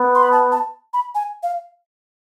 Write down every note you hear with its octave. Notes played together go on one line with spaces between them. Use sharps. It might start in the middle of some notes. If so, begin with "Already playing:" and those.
Already playing: B3
C6
B5
A5
A5
B5
G#5
F5